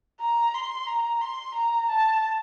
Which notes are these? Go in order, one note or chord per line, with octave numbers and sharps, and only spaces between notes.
A#5
C6
A#5
C6
A#5
A5